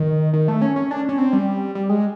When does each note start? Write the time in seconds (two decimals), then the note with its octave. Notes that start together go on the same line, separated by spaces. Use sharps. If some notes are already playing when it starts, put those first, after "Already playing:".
Already playing: D#3
0.33 D#3
0.48 A3
0.62 C#4
0.76 C#4
0.91 D4
1.09 C#4
1.18 C4
1.33 G3
1.75 G3
1.89 G#3